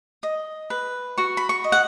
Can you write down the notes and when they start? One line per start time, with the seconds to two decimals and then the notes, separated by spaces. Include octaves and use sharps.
0.23 D#5
0.70 B4
1.18 F#4 C#6
1.37 B5
1.49 C#6
1.64 D#5
1.72 F#5